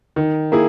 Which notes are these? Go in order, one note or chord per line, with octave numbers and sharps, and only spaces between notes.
D#3
A#3 E4 G#4